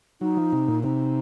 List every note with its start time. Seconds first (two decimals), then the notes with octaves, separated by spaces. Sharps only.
0.21 F#3 D#4
0.37 F3
0.52 C3
0.68 A#2
0.83 C3 D#4